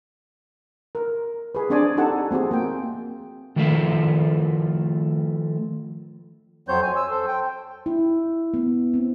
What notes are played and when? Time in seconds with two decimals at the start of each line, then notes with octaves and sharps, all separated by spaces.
0.95 A#4
1.55 G#4 B4
1.70 C4 D4 G#4 C5 D5 G#5
1.97 D#4 G4 A4 F#5 A5
2.31 A3 C4 F#4 G#4
2.51 A#3 G5
3.56 D#3 F3 A3 A#4 E5 F5
6.68 F2 F#3 C4 C5 C#5 G6
6.83 G#5
6.96 E6
7.10 A4 C5
7.27 G5
7.86 E4
8.54 B3
8.94 C4